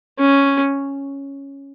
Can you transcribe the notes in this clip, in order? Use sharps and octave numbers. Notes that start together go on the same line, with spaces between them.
C#4